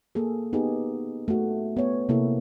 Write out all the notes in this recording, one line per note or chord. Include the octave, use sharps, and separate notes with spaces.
A#3 G#4 A4
B3 D#4 G4 G#4
A3 F#4
B3 C#5
C3 A#3 E4 A4